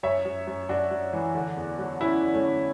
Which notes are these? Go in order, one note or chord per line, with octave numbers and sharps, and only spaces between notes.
F#2 C#5 E5
F#2
F#2
F#2 D4 F#4
F#2
E3
D3
E2
F#3
F#3 C#4 E4
D3
A3 C#4
D3